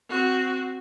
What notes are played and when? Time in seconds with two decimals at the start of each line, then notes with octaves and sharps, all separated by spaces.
0.10 C4 F#4